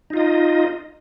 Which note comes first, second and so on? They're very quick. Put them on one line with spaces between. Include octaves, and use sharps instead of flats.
D#4 F4 D#5